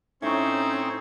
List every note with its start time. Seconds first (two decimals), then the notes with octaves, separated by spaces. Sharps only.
0.22 A2 C4 C#4 D#4 C5 C#6